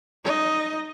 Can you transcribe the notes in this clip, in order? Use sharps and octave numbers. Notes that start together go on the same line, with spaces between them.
D#4 D#5